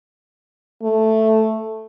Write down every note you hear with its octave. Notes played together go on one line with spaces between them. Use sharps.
A3